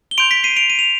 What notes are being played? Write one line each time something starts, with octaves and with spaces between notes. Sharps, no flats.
G7
C6 G6 D7 F7
B6 D7
C7 D#7
D7 F7
D#7
F7